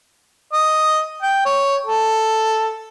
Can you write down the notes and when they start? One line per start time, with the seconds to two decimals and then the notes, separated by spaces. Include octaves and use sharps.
0.53 D#5
1.23 G5
1.46 C#5
1.86 A4